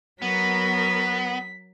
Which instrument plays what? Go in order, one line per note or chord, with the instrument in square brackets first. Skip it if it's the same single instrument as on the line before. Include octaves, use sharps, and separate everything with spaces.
[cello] F#3 A#4 [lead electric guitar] B3 [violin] B6